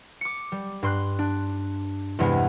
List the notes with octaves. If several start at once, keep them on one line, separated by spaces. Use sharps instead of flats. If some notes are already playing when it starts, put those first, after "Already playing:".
D6 C#7
G3
G2 C6 F#6
D4
E2 G2 C3 G#3 B3